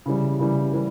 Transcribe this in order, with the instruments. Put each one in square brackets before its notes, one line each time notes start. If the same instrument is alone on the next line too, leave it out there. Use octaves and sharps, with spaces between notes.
[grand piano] C#3 E3 G3
C#3 E3 G3
E3 G3